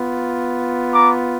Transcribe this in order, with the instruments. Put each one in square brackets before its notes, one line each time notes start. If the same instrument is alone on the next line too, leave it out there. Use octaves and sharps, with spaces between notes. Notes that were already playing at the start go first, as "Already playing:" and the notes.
Already playing: [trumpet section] B3 F4
A#5 D6